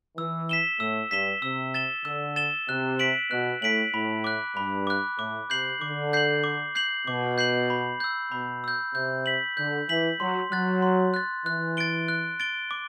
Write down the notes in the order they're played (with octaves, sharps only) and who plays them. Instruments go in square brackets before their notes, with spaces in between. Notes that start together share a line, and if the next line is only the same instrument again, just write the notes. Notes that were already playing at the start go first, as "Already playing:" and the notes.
[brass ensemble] E3 [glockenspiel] E6
[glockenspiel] B6 E7 G7
[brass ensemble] A2 [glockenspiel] E6
[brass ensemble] G2 [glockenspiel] B6 E7 G7
[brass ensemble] C3 [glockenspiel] E6
[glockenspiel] A6 E7 G7
[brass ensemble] D3 [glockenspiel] E6
[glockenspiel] A6 E7 G7
[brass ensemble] C3 [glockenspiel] F#6
[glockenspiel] B6 D7 F#7
[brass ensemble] B2 [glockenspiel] F#6
[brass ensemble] A2 [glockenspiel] B6 D7 F#7
[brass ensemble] A2 [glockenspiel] B5
[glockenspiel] D6 F#6
[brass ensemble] G2 [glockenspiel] B5
[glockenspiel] D6 F#6
[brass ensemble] A2 [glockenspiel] D6
[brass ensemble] C3 [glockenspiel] G6 C7 F#7
[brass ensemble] D3 [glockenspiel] D6
[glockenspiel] G6 C7 F#7
D6
G6 C7 F#7
[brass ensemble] B2 [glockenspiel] D6
[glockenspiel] G6 C7 F#7
B5
E6 G6
[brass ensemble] B2 [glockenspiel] B5
[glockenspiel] E6 G6
[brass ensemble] C3 [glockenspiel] G6
[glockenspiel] B6 F#7
[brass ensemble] D3 [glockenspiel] G6
[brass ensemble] E3 [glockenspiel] B6 F#7
[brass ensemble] F#3 [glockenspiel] C6
[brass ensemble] F#3 [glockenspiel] F#6 A6
[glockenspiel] C6
F#6 A6
[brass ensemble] E3 [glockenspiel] F#6
[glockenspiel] A6 D7 G7
F#6
A6 D7 G7
D6